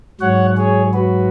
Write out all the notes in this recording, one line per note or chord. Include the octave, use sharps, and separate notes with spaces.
G#2 F#3 C#5 F#5
G#4 C#5
F#4 B4